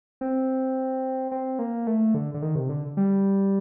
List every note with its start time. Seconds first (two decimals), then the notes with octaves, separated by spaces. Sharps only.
0.21 C4
1.32 C4
1.59 A#3
1.87 A3
2.14 D3
2.34 D3
2.42 D#3
2.55 C3
2.69 D3
2.97 G3